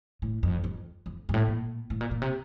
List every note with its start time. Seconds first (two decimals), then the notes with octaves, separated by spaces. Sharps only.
0.22 A2
0.43 F2
0.64 F2
1.06 F2
1.29 G2
1.34 A2
1.48 A#2
1.90 A2
2.01 A#2
2.11 A#2
2.22 C3